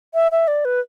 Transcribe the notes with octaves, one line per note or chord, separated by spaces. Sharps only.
E5
E5
D5
B4